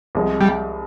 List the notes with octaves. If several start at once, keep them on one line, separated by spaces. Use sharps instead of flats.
C2 C3 F3 G#3
G3